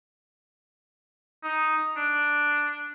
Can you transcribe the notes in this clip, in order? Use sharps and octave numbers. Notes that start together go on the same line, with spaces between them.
D#4
D4